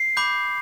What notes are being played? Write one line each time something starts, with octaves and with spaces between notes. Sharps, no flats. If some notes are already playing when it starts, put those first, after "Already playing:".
Already playing: C7
B5 D6 G6